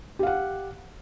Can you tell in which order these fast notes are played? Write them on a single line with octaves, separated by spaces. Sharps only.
G4 F5 F#5